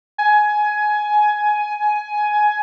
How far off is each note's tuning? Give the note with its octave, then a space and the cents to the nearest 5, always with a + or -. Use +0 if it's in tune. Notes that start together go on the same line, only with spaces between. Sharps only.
G#5 +15